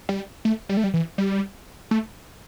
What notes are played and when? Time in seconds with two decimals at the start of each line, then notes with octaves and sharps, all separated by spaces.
0.09 G3
0.45 A3
0.69 G3
0.77 A3
0.84 G3
0.94 E3
1.18 G3
1.91 A3